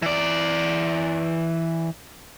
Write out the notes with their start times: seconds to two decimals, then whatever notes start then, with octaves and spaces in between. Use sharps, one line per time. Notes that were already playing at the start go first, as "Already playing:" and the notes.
0.02 E3 D5